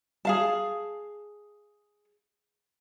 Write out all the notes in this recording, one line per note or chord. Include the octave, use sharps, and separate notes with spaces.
G#4 F5 A5